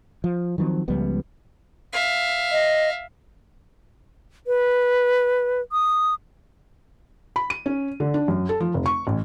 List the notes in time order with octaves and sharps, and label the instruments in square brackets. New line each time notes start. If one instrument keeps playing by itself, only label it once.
[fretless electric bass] F3
D#3 F3 F#3 C4
C#2 F3 G3 B3
[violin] E5 F5
[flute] D#5
B4
D#6
[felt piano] B5
D#7
C#4
D3
D4
F#2
A4
F3
F1
C#6
A1